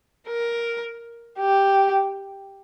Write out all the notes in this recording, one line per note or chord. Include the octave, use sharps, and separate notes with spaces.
A#4
G4